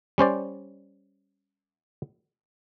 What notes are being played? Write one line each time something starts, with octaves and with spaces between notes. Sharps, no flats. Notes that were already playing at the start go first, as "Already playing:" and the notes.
G3 C#4 C5 D5